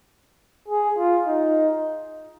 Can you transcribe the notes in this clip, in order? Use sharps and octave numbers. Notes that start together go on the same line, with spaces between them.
G#4
F4
D#4